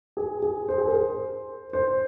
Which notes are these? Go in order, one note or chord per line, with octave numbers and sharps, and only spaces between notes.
G#4
G#4
C5
G#4
A#4
C5
C5